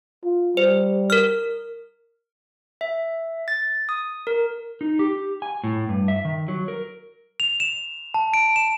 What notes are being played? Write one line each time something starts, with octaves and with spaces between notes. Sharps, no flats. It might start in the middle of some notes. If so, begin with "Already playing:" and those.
F4
G3 C5
A#4 F6
E5
A6
D#6
A#4
D#4
G4
G#5
A2
G2
E5
D#3
F#3
A#4
F7
E7
A5
D7
E7